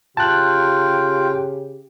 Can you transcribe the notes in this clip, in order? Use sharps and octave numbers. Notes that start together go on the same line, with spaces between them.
C#3 F4 G4 G5 A5 F#6